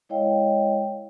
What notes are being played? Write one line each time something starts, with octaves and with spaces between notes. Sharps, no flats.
G#3 E4 C#5 D#5 F5 G5